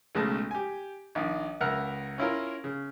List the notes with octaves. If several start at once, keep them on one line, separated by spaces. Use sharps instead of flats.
B1 C#3 G#3 A3 A5
G4 G#5
A#1 D#3
C#2 A#4 E5 F#5 F6
C#4 E4 F4 A#4
C#3